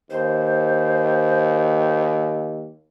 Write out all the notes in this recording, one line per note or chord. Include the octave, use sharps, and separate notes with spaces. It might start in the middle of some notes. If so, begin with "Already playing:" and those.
D#2 C5